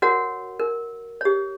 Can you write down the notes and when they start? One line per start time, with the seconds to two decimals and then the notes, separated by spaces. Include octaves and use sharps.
0.02 F#4 A#4 C#5 F#5
0.59 A#4
1.21 G4 C#5